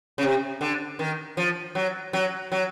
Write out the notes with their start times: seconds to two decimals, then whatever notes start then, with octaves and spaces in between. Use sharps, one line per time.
0.18 C#3
0.23 C3
0.61 D3
0.99 D#3
1.37 F3
1.75 F#3
2.13 F#3
2.52 F#3